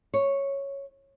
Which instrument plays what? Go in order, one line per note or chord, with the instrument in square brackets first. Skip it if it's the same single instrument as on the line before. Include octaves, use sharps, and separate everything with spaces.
[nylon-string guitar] C#5